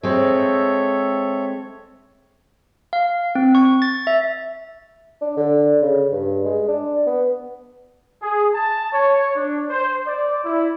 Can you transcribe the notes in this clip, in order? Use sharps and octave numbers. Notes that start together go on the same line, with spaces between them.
G#3 C4 A4 C#5 E5
F5
C4
C#6
A6
E5
D4
D3
C#3
G2
G#3
D4
B3
G#4
A5
C#5
D4
C5
D5
E4